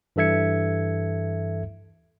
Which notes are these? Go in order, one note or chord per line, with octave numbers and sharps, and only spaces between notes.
G2 E3 A4 E5 G#6 C#7